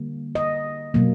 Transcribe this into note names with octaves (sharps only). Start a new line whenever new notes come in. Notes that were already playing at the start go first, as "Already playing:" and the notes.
Already playing: D3 G3 A#3
D#5
B2 F#3 A#3